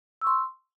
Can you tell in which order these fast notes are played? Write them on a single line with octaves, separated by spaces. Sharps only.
E6 C#6 C6